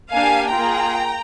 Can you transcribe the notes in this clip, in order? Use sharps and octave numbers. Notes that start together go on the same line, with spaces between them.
A#3 D4 G4 F5 G#5
A#3 F4 G#4 G5 A#5